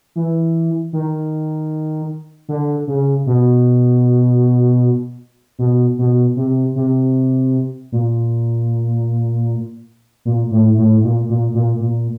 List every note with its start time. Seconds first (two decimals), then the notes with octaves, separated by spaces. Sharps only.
0.16 E3
0.93 D#3
2.49 D3
2.87 C#3
3.26 B2
5.59 B2
5.99 B2
6.37 C3
6.76 C3
7.92 A#2
10.25 A#2
10.51 A2
10.78 A2
11.04 A#2
11.30 A#2
11.55 A#2
11.81 A#2